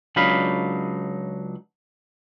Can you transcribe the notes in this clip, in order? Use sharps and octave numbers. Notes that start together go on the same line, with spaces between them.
C#2 F#3 D4 D#4 F5 B5